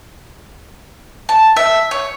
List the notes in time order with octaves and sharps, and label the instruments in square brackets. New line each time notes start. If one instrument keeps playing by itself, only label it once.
[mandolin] A5
E5
C#5